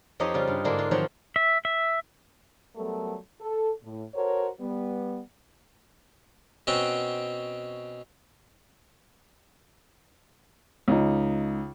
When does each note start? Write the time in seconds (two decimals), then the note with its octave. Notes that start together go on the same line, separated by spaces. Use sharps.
0.20 F2 C4 D#4 G4 C#5 D#5
0.34 C#3 G3 F4
0.47 G2
0.65 G#2 D3 G#3 A#3 D4 E4
0.78 F4
0.91 D#3 F3 F#3 C4 F4 C#5
1.36 E5
1.65 E5
2.76 F#3 G3 A3 B3 A4 A#4
3.40 A4
3.83 A2
4.15 F#4 A4 A#4 C5 C#5
4.59 G3 B3
6.67 B2 C4 C#4 F#5 G5
10.88 C#2 D#4